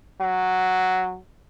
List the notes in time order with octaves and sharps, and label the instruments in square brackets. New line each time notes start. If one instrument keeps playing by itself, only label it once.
[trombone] F#3